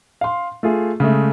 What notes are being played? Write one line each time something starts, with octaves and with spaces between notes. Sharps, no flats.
F5 C6
A3 F4 G#4
C#3 G#3 A3